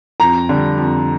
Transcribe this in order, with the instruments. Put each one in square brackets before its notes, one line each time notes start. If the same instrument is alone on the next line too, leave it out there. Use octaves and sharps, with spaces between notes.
[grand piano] F2 [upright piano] A#5
[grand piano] D3 G3
F2